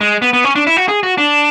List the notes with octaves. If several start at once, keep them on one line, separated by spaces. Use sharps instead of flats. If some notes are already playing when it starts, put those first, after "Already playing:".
G#3
B3
B3
C#4
D4
E4
F#4
G#4
F#4
D4